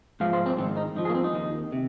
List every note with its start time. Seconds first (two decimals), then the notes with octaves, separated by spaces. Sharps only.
0.20 G#2 F3 F5
0.33 C5
0.46 C4
0.58 G#2 D#3 C4
0.77 D#4
0.96 F2 F3 D#4
1.05 G#4
1.10 A#3
1.15 C4
1.24 D#4
1.33 D#2 D#3
1.72 C3